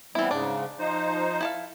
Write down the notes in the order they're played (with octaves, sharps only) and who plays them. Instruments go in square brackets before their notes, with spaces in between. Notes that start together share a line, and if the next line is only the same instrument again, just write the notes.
[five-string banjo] E3 E4 [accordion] G3 B3 C4
[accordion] G#2 C#3 [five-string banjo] D4
[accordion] F3 D#4 C5
[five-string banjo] E4 A4 F5